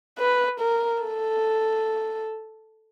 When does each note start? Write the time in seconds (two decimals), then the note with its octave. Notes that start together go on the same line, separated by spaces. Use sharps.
0.19 B4
0.60 A#4
1.03 A4